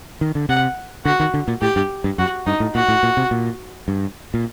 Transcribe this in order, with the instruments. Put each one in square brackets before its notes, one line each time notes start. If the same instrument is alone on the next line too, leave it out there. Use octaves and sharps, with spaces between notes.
[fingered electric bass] D#3
D3
[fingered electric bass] C3 [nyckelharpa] F#5
[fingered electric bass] D3 [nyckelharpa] F#4
[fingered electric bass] D#3
D3
A#2
[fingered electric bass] A2 [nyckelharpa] G4
[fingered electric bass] G2
G2
[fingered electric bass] F#2 [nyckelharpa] F#4
[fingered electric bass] G2 [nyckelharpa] D#4
[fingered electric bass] A2
[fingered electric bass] A#2 [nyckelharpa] F#4
[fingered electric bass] A2
A#2
C3
A#2
G2
A#2